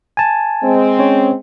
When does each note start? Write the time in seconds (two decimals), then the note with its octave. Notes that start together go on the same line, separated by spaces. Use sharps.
0.17 G#5 A5
0.63 G#3 C4
0.99 C#4 C#5